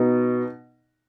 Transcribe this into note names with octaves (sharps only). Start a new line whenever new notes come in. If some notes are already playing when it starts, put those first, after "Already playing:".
Already playing: B2 B3 D#4